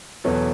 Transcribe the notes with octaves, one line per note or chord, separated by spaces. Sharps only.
E2 B2 F#3 B3 A4 C#5